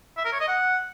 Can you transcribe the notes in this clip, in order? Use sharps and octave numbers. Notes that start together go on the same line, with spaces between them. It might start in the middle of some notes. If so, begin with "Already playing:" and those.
E5
A#4
C#5
D#5
F#5